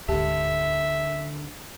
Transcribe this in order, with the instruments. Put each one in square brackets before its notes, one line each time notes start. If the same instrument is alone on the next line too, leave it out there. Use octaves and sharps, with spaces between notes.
[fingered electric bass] D#1 D2 G#2 [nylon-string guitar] D3 A5 [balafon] G4 [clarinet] E5